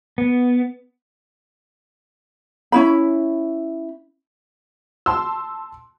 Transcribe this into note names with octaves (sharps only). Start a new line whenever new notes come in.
B3
C#4 E4 B5
A5 C6 E6